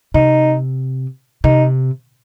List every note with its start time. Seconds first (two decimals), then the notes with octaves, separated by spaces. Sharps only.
0.14 C3 D#4
1.44 C3 D#4